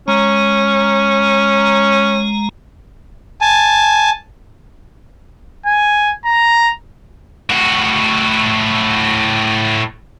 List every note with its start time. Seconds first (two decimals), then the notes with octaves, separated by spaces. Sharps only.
0.08 G#3 C#4 A#5
3.41 G#5 A5
5.66 G#5
6.25 A#5
7.49 A2 F#4